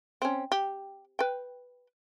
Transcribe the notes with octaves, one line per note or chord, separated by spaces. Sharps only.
C4 C#4
G4
B4 G5